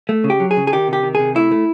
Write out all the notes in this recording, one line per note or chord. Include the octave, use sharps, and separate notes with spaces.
A3
C#3
G4
F#3
G#4
C#3
G#4
D#3 G4
C3
G4
D#3
C3 G#4
A3 E4
A3